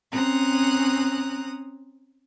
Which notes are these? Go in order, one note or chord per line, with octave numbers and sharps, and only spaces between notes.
C4 C#4 A#5 D#6 F#6